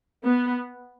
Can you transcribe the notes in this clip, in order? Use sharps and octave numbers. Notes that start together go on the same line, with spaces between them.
B3